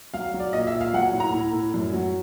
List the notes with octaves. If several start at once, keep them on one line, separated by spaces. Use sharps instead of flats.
F#3 F5
F#3
D5
A#2 D#5
E5
A#2
F5
F#3 F#5
A2
A#5
A2
A2
F#2
F#3